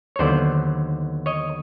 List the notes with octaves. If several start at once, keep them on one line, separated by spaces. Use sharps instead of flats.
C#5
D#2 D3 F#3 B3 C5 D5
C#5 D#5